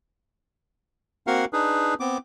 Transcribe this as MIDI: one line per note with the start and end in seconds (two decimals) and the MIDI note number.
1.27 1.45 58
1.27 1.45 60
1.27 1.45 66
1.27 1.45 70
1.27 1.45 77
1.27 1.45 78
1.53 1.94 62
1.53 1.94 63
1.53 1.94 68
1.53 1.94 71
2.00 2.18 59
2.00 2.18 60
2.00 2.18 86